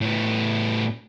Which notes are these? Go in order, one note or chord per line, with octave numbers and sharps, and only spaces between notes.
A2 B3